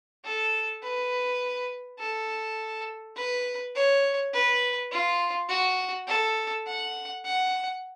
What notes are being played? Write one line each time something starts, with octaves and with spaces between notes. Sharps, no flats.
A4
B4
A4
B4
C#5
B4
F4
F#4
A4
F#5
F#5